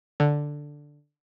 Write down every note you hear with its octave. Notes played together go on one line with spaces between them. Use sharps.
D3